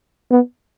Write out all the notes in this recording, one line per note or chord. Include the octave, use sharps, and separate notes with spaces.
B3